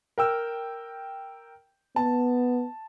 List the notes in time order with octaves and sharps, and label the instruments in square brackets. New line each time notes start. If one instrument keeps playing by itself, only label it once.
[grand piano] A#4 G5 E6
[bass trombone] B3 [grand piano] A5